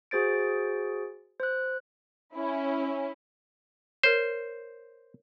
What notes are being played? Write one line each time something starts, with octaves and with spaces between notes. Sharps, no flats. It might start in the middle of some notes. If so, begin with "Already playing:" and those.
F#4 G#4 C5 A6 D7
C5 F#6
C#4 E4
A#4 C5 C#5